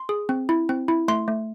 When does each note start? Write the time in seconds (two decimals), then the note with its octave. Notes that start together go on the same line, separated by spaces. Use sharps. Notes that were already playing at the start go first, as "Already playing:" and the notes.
Already playing: C6
0.09 G#4
0.29 C4
0.49 E4
0.69 C4
0.88 E4
1.08 A3 C6
1.28 A3